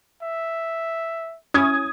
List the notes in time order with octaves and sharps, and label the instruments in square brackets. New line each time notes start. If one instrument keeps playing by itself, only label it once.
[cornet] E5
[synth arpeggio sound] C#4 E4 [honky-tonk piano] D#6 G#6